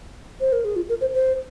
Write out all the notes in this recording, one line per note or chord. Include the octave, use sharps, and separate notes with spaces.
C5
A#4
G#4
F4
A#4
C5
C5